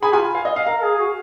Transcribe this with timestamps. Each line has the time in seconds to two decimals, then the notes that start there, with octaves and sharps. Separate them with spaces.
0.02 G#4 G#5 B5
0.13 F4 G#5 B5
0.35 F5 G#5
0.45 D#5
0.56 F5
0.67 A#4 F5
0.83 G#4
0.95 G#4
0.99 F#4